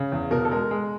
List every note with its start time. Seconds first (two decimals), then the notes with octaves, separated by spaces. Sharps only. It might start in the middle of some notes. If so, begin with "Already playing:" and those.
Already playing: C#3
0.12 E2
0.31 B2 A#4
0.45 A4
0.51 G#3 A#4
0.71 G#3